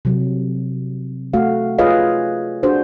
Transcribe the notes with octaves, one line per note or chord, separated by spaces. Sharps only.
C3 F#3
A3 F#4 F5
F4 G#4 B4 C#5 D#5 F5
D4 F#4 G#4 C5